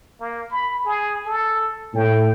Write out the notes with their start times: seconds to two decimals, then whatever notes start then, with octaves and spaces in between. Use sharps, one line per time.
0.20 A#3
0.51 B5
0.85 G#4
1.26 A4
1.95 A2 G5